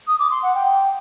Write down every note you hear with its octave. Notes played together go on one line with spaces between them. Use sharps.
D#6
D6
C6
F#5
G5